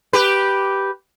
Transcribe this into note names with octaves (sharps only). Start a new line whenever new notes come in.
G4 B4